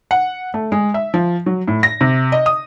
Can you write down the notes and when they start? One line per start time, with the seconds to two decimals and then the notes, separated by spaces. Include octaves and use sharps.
0.11 F#5
0.54 A3
0.72 G#3
0.94 E5
1.14 F3
1.46 F#3
1.68 A2
1.83 A#6
2.01 C3
2.32 D#5
2.46 D#6